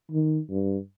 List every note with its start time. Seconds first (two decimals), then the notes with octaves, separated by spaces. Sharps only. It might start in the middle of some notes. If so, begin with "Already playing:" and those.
0.12 D#3
0.50 G2